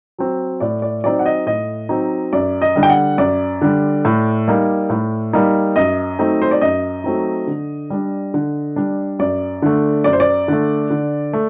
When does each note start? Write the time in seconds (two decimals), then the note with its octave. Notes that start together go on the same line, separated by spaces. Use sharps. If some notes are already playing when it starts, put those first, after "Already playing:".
0.19 F#3 C4
0.60 A2 D5
0.82 D5
1.04 F#3 C4 D#4 D5
1.19 F#5
1.26 D#5
1.46 A2 D#5
1.89 F#3 C4 D#4
2.33 F#2 D5
2.62 D#5
2.76 D3 G3
2.83 G5
2.90 F#5
3.18 F#2 D5
3.61 D3 G3
4.05 A2
4.48 G3 A#3 D#4
4.90 A2
5.33 G3 A#3 D#4
5.76 F#2 D#5
6.19 F#3 A3 C4 D#4
6.42 C5
6.51 D5
6.61 F#2 D#5
7.04 F#3 A3 C4 D#4
7.47 D3
7.90 G3 D4
8.34 D3
8.76 G3 D4
9.19 F#2 D5
9.62 D3 A3
10.04 F#2 D5
10.13 C5
10.20 D5
10.48 D3 A3
10.90 D3
11.33 A3